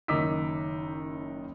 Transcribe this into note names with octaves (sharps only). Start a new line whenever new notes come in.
F#1 D#3 D#4 D6 E6 B6